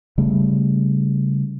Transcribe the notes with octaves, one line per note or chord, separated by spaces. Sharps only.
C#3 G3 A3